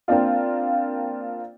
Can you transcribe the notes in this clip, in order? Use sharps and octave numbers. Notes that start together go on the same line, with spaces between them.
A#3 C4 D4 F4